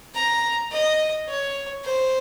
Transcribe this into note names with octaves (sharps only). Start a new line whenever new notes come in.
A#5
D#5
C#5
C5